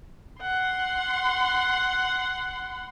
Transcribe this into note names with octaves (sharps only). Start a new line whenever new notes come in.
F#5 C6